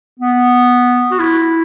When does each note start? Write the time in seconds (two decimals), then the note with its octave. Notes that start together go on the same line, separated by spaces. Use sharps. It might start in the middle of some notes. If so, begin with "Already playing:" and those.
0.19 B3
1.11 F#4
1.19 E4